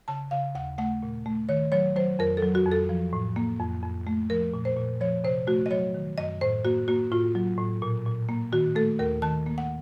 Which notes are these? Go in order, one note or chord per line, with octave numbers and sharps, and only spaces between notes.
C#3 A5
C#3 F5
D#2 F#5
A3 F#5
A#2
A3
D#3 C#5
F#3 C#5
F#3 C5
F2 A#4
A4
F#3
F#4
F2
A4
F3
A2
A#3
F2
F2
A3
F3 A#4
A#2
C5
A#2
F3 C#5
C3 C5
A3 F#4
D#5
F#3 C#5
D#3
F#2 D#5
A2 C5
A#3 F#4
A#3 F#4
A2 F4
F#3
A2
A#2
A#2
A#3
D#3 F#4
A3 A4
D#2 A#4
D#3 A5
A#3
F#5